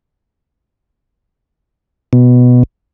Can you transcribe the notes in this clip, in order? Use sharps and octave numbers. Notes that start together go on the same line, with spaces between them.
B2